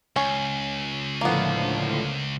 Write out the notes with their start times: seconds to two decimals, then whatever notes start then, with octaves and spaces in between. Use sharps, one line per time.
0.16 C#2 C#4
1.21 A2 D3 F3 A#3 B3